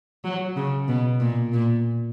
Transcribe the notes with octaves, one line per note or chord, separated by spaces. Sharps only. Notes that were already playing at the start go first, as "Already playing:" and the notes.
F#3
C#3
B2
A#2
A#2